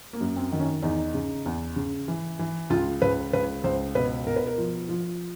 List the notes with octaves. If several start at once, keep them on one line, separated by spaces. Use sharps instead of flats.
A#3
F#2
C4
D#3
C#4
E2 D#4
C#3
E2
C#3
E3
E3
C#2 F4
C#2 B4
C#2 B4
C#2 C5
B2 B4
B2 A#4
B4
A#4
F3
F3